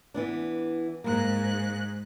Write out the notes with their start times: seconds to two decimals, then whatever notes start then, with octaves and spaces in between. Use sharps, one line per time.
0.14 E3 B3 D4
1.04 G#2 A#3 F#6